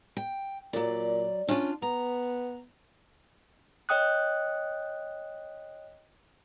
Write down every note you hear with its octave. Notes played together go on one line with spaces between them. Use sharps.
G5
A#2 F#3 D5
C#4 D4 F4
B3 A#5
C#5 D#5 G5 D#6 F#6